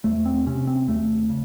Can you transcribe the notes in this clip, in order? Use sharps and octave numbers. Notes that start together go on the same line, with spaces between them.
E2 A3
C4
C3 C#4
C4
D#2 A3
C#3